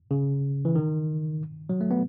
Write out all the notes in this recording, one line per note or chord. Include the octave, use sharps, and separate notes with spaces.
C#3
E3
D#3
F#3
A3
B3